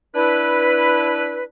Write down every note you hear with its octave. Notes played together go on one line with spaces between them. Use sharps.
D4 E4 B4